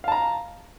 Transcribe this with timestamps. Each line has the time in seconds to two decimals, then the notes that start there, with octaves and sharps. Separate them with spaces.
0.04 F5
0.08 A5
0.12 A#5